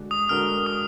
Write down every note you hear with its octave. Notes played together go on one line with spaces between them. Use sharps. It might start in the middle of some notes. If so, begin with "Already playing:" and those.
Already playing: D3 G#3 D4 F#4
D#6
D3 G#3 D4 F#4 A#4 F6
D#6